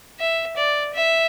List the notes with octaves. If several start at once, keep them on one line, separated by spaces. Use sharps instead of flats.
E5
D5
E5